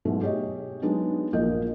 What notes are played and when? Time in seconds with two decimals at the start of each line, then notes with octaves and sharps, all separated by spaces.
0.05 G#2 B2 F#3 G#3 A3
0.21 G4 G#4 C#5 D#5
0.82 F#3 G#3 B3 D4 D#4
1.33 A#1 F3 A#3 D#5 G6